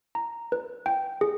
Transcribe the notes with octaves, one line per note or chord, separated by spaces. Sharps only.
A#5
B4
G5
G#4